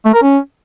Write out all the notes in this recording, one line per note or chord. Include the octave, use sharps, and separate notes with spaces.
A3
A#4
C#4